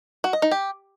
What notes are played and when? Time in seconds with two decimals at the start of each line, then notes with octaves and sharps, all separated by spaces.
0.24 F#4
0.33 D#5
0.42 D#4
0.51 G4